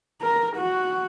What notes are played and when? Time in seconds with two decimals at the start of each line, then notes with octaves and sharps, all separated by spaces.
0.22 A#4
0.56 F#4